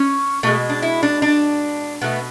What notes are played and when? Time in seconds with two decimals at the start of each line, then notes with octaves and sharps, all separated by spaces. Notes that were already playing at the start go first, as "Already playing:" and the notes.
Already playing: C#4
0.43 B2 G#3 A3
0.69 D4
0.82 E4
1.03 D4
1.22 D4
2.01 B2 A3 B3